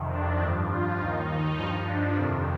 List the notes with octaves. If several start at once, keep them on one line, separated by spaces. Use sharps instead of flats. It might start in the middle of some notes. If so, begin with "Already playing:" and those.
Already playing: F2 C3 D#3
D4
G2 F3
F4
D#2 D#3 D#4
G2 F3 D#4
D4
F2 C3 D#3